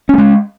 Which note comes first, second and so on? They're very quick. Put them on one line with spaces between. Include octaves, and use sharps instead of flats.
C#4 A3 G#3